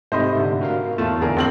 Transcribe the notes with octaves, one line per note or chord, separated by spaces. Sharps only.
G#2 C3 A3 C5 D#5 B5
D3
F#4 A#4 F5
E2 A2 A3 F4 A5
D3 G#4 A#4
A#1 C4 F#7